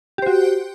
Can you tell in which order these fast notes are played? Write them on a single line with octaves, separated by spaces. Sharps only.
G4 C5 F#4